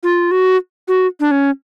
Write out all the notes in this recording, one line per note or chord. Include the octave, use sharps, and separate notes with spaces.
F4
F#4
F#4
D4
C#4